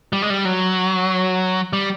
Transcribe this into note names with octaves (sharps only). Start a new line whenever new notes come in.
G3
G#3
G3
F#3
G3